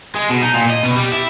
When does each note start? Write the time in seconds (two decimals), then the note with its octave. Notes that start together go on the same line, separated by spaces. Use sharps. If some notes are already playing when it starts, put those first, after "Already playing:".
0.16 G#3
0.30 B2
0.43 D#4
0.54 A#2
0.70 D#5
0.83 B2
0.96 G3
1.12 E4